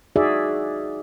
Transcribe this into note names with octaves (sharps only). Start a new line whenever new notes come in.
D#4 F#4 G#4 D5 E5